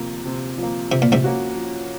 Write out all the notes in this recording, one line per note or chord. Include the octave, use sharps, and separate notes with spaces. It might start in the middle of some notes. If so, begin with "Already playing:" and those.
Already playing: C3 F3 A#3
C3
F3 A#3
C3 F3
A#2
G#2 C3
A#3 C#4 F#4
F3